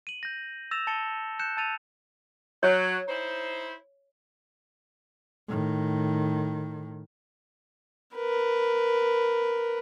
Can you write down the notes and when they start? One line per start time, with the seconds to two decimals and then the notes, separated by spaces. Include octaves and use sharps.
0.07 D#7 F#7
0.23 G6 A#6
0.71 E6 A6 A#6 E7 F7
0.87 A5 A6 C#7 E7 G7
1.39 F#6 G6 C#7 E7
1.57 A5 E6 A6 D#7 F7
2.63 F#3 C#5
3.08 D#4 E4 C5
5.48 A2 D#3
8.16 A#4 B4